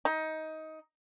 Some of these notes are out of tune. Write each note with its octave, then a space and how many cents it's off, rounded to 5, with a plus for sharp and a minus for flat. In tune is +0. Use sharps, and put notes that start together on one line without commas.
D#4 +20